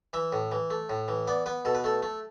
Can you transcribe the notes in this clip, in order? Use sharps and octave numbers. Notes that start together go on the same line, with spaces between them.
E3 E5
A2
E3
A3
A2
E3
B3 D5
B3 B4
B2 A4
B4
A3 A4
A3